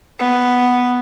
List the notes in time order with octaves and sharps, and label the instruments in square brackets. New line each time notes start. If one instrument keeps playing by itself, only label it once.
[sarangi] B3